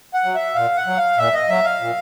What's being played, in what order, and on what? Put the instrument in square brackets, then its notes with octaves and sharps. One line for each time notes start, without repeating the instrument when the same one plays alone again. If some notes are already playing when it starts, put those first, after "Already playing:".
[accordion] F#5
F#3
E5
A#2 F5
F#5
F#3
F5
A#2 E5
D#5
F#3 E5
F5
A#2